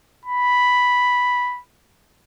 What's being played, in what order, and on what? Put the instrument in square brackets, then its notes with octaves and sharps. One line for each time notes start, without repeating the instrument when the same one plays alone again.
[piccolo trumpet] B5